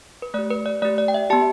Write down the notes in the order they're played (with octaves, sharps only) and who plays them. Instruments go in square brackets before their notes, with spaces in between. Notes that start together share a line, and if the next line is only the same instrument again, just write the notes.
[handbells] B4
A3 D5
G4
B4
D5
A3 D5
G4
D5
G5
E5
B3 G4 A5